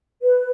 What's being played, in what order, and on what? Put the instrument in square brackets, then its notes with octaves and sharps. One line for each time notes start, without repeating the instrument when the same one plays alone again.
[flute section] B4